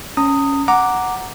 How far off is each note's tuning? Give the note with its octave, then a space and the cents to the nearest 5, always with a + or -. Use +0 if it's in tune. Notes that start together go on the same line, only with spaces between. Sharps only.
C#4 +0 A#5 -40 D#6 +0
F#5 +0 A#5 +0 D6 +0